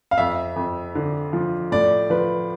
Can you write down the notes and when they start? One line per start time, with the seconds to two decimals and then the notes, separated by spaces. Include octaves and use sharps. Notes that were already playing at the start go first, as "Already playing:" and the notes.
0.11 F5
0.18 F2 E5
0.56 F2
0.95 D3
1.33 F3
1.72 A2 D5
2.10 F3 B4